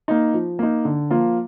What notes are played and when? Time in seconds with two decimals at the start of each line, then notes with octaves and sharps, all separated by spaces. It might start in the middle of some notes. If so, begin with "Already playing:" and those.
0.08 A#3 D#4
0.34 F3
0.59 A#3 D#4
0.85 D3
1.11 F3 A#3 F4